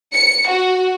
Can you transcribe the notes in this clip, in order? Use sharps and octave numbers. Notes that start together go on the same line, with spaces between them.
C#7
F#4